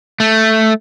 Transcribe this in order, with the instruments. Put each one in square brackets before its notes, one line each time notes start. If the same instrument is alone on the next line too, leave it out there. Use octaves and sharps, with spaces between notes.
[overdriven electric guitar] A3